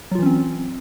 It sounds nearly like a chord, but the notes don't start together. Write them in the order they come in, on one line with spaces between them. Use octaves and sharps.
F#3 F4 E3 C#4 C4